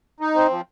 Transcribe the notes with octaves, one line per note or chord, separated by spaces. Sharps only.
D#4
C4
F3